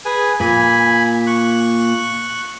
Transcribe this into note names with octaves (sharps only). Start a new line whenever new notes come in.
G#4 B4 G#5
A#2 G#5 B5
C#6 F#6